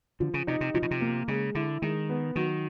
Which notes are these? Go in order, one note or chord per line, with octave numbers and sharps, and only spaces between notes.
D3 F3
C#3
C3 D#4
C3
C3 F3
B2
C3
A#3
C#3 G#3
D3 E4
D#3 G#3
B3
D#3 F#3